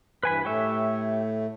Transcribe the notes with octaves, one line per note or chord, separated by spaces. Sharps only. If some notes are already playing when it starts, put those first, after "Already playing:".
G2 E3 B4 G#5 B5
A2 A3 G4 C#5 E5